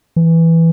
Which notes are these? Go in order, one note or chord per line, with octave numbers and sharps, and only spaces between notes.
E3